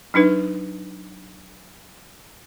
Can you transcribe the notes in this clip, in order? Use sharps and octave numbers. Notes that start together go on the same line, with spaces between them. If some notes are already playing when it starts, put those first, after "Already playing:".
F#3 D4 D#4 B4